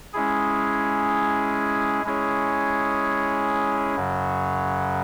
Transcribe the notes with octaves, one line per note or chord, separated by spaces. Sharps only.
G#3 C#4 E4 G#4
G#3 C#4 E4 G#4 C#5
F#2 C#3 F#3